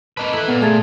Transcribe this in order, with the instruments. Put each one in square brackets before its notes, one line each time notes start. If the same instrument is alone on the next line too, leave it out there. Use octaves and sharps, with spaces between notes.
[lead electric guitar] A#3 B4 [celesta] D#5 A5
[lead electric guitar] E4 B4 [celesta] A4 A#5 F#7
[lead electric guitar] A#2 [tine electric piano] B3
[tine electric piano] A3 G#4 [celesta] A5 G#6 A6